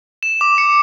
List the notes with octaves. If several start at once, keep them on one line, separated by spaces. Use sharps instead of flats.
E7
D6
C#7